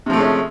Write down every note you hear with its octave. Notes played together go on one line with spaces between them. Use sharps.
C3 F3 G#3 A3 C#4